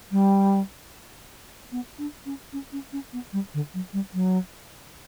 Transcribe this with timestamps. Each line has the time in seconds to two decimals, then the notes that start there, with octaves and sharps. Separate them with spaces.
0.11 G3
1.71 B3
1.98 D4
2.25 C#4
2.52 C#4
2.72 C#4
2.92 C#4
3.13 B3
3.32 G3
3.54 D3
3.73 F#3
3.93 G3
4.13 F#3